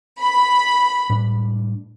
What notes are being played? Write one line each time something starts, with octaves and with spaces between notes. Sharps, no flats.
B5
A2 G3 D4